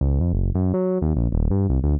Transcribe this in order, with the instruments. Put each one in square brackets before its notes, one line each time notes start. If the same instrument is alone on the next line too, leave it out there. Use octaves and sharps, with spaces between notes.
[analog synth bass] C#2
F2
F#1
F#2
F#3
D#2
A#1
D#1
G2
C2
D2